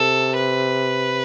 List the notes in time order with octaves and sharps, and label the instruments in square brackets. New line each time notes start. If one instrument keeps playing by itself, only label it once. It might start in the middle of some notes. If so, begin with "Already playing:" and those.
Already playing: [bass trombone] C3 [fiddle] A4
[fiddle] B4